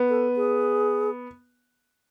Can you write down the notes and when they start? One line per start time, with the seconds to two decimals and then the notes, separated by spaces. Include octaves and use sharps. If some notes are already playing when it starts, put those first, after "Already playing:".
Already playing: B3
0.09 A4
0.36 G#4